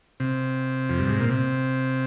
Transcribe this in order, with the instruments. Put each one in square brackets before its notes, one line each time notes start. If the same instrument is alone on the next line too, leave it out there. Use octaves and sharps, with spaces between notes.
[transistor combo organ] C3
F2
G2
G#2
A#2
C3